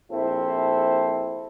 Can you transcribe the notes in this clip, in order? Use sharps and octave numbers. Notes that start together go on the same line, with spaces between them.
A#1 C4 E4 A4 C5